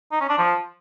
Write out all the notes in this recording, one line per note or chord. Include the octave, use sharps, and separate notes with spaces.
D#4
C#4
D4
F3